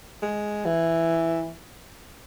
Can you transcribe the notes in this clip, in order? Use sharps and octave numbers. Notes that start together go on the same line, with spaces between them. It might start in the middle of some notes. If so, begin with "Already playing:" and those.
G#3
E3